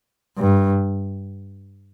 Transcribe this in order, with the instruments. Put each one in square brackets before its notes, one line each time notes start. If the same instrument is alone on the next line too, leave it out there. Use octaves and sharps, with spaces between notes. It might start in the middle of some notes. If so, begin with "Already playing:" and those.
[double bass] G2